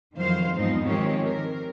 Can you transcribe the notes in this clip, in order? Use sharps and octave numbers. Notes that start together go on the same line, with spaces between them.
F2 D#3 E3 F#3 C5 F5
E2 G#2 F3 C4 D#4
D#3 F3 G#3 C4 G4 C#5
A#4